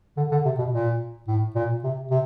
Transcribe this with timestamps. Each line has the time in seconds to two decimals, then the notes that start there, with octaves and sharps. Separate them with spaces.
0.17 D3
0.31 D3
0.45 C3
0.58 B2
0.72 A#2
1.27 A2
1.55 A#2
1.83 C3
2.11 C3